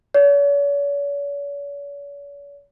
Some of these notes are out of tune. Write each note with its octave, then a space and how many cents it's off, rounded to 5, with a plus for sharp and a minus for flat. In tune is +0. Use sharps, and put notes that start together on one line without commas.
C#5 +45